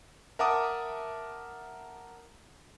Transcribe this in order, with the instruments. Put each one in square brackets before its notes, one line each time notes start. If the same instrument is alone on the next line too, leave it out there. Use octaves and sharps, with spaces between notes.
[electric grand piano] A#4 E5 F#5 A5 D6 D#6